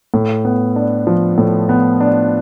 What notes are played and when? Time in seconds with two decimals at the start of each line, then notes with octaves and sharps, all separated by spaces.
0.14 A2
0.45 B3
0.76 D4
1.07 F3
1.38 A2
1.69 B3
2.00 D4